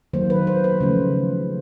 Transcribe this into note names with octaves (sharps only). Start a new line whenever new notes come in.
D#3 F#3 A#3 C5
B4
C5
B4
C#3 F3 A3